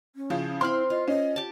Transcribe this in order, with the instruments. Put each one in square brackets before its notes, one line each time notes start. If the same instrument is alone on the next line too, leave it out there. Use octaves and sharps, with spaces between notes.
[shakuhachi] C#4
[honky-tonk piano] C#3 F3 [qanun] E4
[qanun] C4 B5 [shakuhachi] E4 [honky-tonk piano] C6 F6
[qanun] F4 [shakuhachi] D#5
[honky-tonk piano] C#4 [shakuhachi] D#5
[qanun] G4 A5